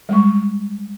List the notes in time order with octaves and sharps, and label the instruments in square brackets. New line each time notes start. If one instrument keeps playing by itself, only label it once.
[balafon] G3 G#3 C#6